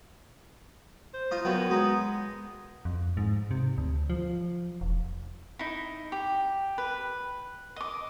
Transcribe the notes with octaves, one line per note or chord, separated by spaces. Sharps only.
C5
D#4 F4 D#5
F#2 F#3 B3 G5
G#3 D#4
F2
G#2
C3
D2
F3
E1
D#4 E4
G4
B4
D#5 D6